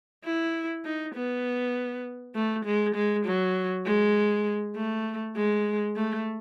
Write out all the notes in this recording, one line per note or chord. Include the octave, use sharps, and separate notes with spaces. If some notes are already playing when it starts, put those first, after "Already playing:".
E4
D#4
B3
A3
G#3
G#3
F#3
G#3
A3
G#3
A3